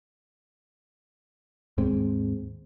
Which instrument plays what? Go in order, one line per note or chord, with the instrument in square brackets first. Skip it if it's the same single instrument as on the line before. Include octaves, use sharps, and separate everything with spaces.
[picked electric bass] D#2 G#2 G#3 C4